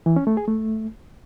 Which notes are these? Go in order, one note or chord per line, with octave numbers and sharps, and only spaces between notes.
E3
C#4
A3
G#4
A3